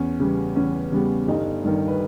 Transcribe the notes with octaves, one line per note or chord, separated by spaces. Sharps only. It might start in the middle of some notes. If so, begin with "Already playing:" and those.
Already playing: E2 C#4
C#3 G3 B3
E2 C#4
C#3 G3 B3
G1 D#4
G2 D#3
B4